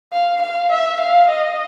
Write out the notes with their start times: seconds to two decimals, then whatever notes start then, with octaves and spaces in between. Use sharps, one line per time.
0.13 F5
0.42 F5
0.72 E5
1.01 F5
1.30 D#5